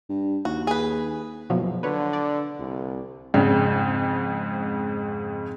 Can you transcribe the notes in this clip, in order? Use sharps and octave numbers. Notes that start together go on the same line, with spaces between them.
G2
D#2 F#4
G#4 B4
F#1 B2 F3 F#3
D3 B4 C#5
D5
C2
F2 G#2 C#3